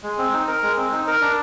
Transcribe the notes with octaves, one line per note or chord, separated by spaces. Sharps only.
G#3
C4
D#4
A#4
G#3
C4
D#4
A#4
D4